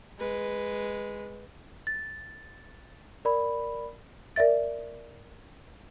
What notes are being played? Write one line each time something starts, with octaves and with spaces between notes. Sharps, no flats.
G#3 B4
A6
A#4 D5 B5
A#4 D5 E5 A6